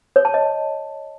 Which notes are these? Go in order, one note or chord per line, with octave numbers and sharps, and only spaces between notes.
C#5
A5
D#5